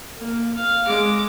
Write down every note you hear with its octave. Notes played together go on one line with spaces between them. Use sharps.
A#3
F5
G#3 D6